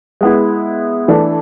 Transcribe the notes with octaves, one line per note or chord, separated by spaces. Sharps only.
G#3 B3 E4
E3 A3 D4